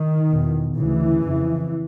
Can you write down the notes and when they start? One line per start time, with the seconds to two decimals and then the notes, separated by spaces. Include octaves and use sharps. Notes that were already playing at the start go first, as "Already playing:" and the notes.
Already playing: D#3
0.30 E2 B2
0.76 D2 C#3 E3
1.22 F2 C#3